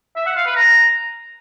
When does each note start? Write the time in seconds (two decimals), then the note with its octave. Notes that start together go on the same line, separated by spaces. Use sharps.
0.16 E5
0.26 F#5
0.36 F5
0.46 B4
0.56 A#5